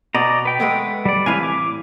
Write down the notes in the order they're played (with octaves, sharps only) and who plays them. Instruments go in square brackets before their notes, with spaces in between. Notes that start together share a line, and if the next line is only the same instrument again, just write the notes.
[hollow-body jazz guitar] B2 [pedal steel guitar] D5 D#5 A#5
[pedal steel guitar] B4 G5
[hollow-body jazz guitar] G#3 A3 B3
[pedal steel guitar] G3 D5
[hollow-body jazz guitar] A2 C3 E3 [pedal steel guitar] B4 F5 G#5
[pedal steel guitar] D6